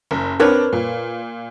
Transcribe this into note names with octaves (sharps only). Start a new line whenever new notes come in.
F#1
C4 D4 A#4 B4 C#5
A#2